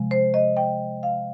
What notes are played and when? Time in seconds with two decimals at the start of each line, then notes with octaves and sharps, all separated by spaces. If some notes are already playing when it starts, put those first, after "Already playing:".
Already playing: C3 F3 G#3
0.11 C5
0.34 D#5
0.57 G5
1.03 F5